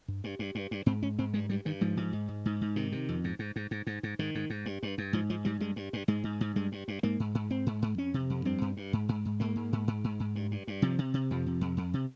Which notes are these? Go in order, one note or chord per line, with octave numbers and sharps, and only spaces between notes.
G2
G2
G2
G2
G2
G#2 C4
G#2 C#4
G#2 C4
G2 G#3
G2 G3
G2 D#3
G#2 F3
G#2
G#2
G#2
G#2
G#2
C3 D#3
C3
F2
G#2
G#2
G#2
G#2
G#2
G#2
G#2 D#3
G#2
G#2
G2
G2
G2
G#2 F3
G#2 F3
G#2 G3
G2 G#3
G2
G2
G#2 G#3
G#2
G#2
G2 G#3
G2
G2
G#2 A#3
G#2
G#2
G#2 C4
G#2
G#2
F2 C#4
C3
F2
G2 C4
G2
G2
G#2
G#2
G#2
G#2 A#3
G#2
G#2
G#2
G#2
G#2
G2
G2
G2
C3 F3
C3
C3
F2 F3
C3
F2
F2
C3